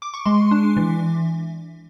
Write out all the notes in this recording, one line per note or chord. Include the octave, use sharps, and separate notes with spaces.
D6
C#6
G#3 C6
D4
E3